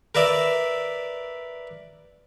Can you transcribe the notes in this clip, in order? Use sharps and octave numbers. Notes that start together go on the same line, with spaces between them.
A#4 B4 D5 E5